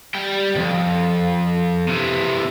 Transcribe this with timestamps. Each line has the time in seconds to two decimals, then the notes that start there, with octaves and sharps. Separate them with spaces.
0.15 G3 G5
0.55 C2 F2
1.88 C3 E3